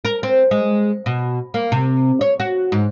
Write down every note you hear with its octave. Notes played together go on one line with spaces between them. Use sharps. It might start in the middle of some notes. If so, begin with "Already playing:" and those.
A#4
C4
G#3
B2
A#3
C3
C#5
F#4
G#2